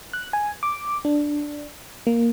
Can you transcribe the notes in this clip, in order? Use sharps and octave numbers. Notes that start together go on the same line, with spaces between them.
F#6
G#5
D6
D4
A#3